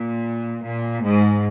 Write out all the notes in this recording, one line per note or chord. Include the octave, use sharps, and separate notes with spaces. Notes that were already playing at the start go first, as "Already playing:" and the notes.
Already playing: A#2
A#2
G#2